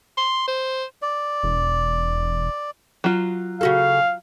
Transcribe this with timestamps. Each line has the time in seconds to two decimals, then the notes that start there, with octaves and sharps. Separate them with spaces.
0.18 C6
0.48 C5
1.02 D5
1.43 E1
3.04 F#3 F4
3.61 C#3 F#4 A4 F5